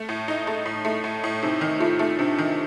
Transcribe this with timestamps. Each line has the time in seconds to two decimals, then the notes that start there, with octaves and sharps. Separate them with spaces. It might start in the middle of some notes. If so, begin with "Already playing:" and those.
Already playing: A3
0.09 A2
0.28 D#4
0.47 A3
0.66 A2
0.85 A3
1.04 A2
1.24 A2
1.43 C3 D#4
1.61 D#3 D#4
1.80 A3 F4
1.99 A3 D#4
2.18 C3 D4
2.38 D#3 D#4